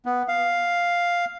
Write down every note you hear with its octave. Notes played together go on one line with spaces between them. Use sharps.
B3
F5